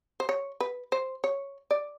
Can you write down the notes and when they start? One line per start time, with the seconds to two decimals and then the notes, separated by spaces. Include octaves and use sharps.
0.20 C5
0.29 C#5
0.60 B4
0.92 C5
1.24 C#5
1.71 D5